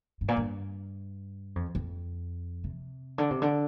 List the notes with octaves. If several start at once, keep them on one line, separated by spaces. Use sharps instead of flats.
G2
A#2
G2
F2
F2
C3
D3
C3
D3